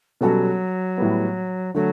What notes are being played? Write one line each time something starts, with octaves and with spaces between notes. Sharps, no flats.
B2 F#3 G3 C#4 F#4 A4
A2 G3 B3
D3 F#3 A3